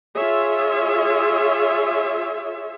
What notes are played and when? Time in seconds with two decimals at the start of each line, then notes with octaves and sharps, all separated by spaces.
0.16 F4 G#4 C#5 E5